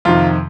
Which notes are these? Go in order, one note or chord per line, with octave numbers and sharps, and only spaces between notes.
F2 C3 D#3 F4